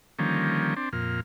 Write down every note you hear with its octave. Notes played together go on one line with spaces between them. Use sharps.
D3 D#3 F3 G3 A#3 C#4
C4 D4
F2 A#2 F6